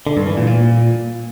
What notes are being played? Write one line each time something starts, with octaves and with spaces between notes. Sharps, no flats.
D3
G2
E3
A#2
A#2